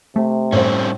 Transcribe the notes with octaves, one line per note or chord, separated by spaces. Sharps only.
C3 A3
A2 G3 C4 C#4 C5